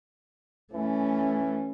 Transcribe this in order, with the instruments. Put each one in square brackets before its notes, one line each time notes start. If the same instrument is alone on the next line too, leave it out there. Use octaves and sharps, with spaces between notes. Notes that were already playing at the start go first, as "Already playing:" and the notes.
[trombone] E3 [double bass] A3 C#4